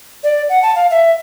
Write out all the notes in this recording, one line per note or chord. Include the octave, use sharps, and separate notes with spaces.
D5
F#5
A5
F5
E5